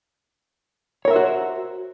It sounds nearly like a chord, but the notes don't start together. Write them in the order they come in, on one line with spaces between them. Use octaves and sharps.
C#5 A#4 E5 C5 F#4